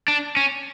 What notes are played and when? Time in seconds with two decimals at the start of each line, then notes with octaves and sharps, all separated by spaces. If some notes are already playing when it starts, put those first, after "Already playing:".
0.08 D4
0.37 C#4